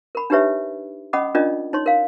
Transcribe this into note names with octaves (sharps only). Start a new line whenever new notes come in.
A#4 B5
D4 D#4 G4 B4 C#5 E5
C#4 D#5 F#5 B5 D6 D#6
C#4 D4 F4 A#4 D5 D#5
D#4 C#5 C6
A#4 F5